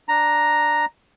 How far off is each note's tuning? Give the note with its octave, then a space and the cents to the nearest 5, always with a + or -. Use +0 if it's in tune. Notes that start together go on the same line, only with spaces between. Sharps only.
D4 +0 A#5 +0